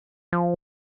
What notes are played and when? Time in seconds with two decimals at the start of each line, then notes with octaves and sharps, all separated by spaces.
0.33 F3